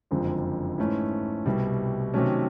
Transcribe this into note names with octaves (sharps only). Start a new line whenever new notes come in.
F#1 F2 D3 F3 G#3
G#2 E3 A3 C#4 E4
C2 B2 G3
C3 D#3 F#3 A3 C#4